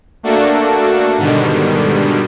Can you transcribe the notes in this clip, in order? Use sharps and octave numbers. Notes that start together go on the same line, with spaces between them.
A3 A#3 D4 F#4 A4
G#2 B2 D3 D#3 G3